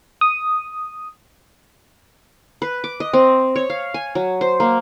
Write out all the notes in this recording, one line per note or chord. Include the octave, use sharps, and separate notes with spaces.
D#6
B4
D6
D#5
C4
C#5
F5
G#5
F#3
C5
A#3